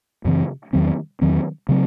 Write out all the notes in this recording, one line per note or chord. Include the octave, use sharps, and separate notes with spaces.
F#2 C#3 E3 C4
E2 D#3 F#3 C4
E2 D#3 F#3 C4
C#3 F#3 C4